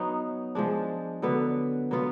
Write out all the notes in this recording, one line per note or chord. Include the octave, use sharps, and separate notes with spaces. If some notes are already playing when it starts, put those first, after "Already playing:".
Already playing: F#3 B3 D#4
F3 G#3 D4
D3 F#3 B3
F#3 B3 F4